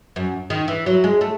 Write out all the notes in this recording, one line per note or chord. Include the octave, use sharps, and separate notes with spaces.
F#2
D#3
E3
F#3
G#3
A3